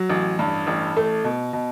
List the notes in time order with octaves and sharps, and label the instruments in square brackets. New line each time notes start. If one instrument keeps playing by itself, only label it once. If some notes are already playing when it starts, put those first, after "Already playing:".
Already playing: [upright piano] F#3
A1
G2
A1
A3
B2
B2